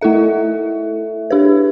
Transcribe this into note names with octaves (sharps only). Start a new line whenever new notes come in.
A3 E4 A4 E5
D4 G4 B4